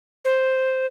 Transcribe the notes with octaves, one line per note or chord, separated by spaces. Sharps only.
C5